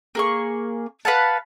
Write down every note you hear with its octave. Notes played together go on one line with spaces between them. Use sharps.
A#3 G#4 C#6
B4 F5 F#5 A5